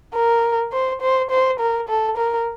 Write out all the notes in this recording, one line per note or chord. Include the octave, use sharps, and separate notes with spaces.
A#4
C5
C5
C5
A#4
A4
A#4